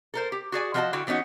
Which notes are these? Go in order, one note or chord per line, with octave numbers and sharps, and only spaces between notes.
A4 A#4 C5
G4
F#4 G#4 D5 G#5
F3 F#4 A4 B4 D#5 A5
D3 E4 F#4 G5
E3 B3 C#4 D#4 F#4